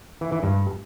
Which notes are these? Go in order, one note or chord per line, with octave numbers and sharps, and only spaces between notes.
E3
E3
G2